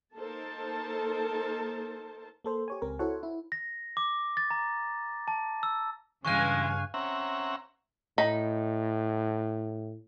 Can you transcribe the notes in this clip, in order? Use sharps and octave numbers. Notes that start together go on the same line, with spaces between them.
A#3 D#4 A4 A#4 C5 A5
A#3 A4 C5
G4 C#5 G#5
C#2 C4 A#4
E4 F#4 A4 C5 C#5 F#5
E4
A#6
D6
A6
A#5
A5
E6
G2 C#3 E3 G#3 F5 G#5 C#6 F#6
C4 C#4 E5 F#5 A#5
A2 D#4 B5